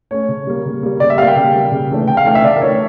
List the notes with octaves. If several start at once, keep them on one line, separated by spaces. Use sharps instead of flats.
A3 C#4 C#5
C#3
G3 A#3
C#3
G3 A#3
C#3 D5
E5
G3 A#3 F5 G5
C#3
G3 A#3
C#3
E3 A3 D4
C#3 G5
F5
E3 A3 D4 G5
E5
C#3 D5
A#4
E3 A3 D4 C#5